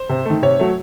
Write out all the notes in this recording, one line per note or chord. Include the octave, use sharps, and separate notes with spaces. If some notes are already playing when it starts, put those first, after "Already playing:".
Already playing: C5
C3
D#3 A3
C3 C#5
F#3 A3